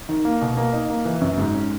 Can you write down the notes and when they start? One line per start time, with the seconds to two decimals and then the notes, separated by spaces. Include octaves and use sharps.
0.09 D#3
0.25 A#3
0.41 B2
0.57 A#3
0.73 D#4
0.90 A#3
1.05 E3
1.21 F#2
1.38 G#2
1.54 C#4